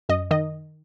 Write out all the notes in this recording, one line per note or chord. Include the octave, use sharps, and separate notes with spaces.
F#2 D#5
D#3 D#5